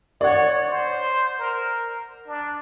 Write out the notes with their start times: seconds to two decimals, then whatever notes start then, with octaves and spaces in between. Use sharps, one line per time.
0.21 C#5 D5 F#5
0.70 C5
1.39 A#4
2.27 D4